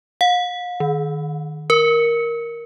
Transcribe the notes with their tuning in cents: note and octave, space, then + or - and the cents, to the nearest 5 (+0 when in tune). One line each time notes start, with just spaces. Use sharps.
F5 +40
D#3 -15
A#4 +5